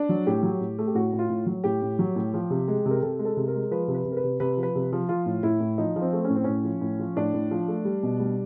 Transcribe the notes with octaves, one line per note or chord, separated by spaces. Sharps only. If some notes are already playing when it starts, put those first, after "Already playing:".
Already playing: D4
F#3
A2 G4
F#3
A2
A3
G4
A2 F#4
A2
F4
A2
F#3
A2 G4
A2
F#3
A2
F3
C3
G#3
C3
A#4
C3 A4
G#3
A4
C3
A#4
G#3
F3 B4
C3
B4
C3
A#4
B4
C3
C3 B4
F3
B4
C3
F3
F3 F4
A2
A2 E4
A2
F3 D#4
F3
C4
A3
C#4
A2
C4
A2 C#4
F3
A2
F3
A2 D4
A2
F3
A3
G3
B2
G3